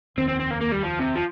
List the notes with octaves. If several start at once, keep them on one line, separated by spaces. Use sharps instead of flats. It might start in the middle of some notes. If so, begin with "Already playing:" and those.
F1 D#2 D#3 C4
C4
C4
A#3
A#3
G3
F3
C3
F3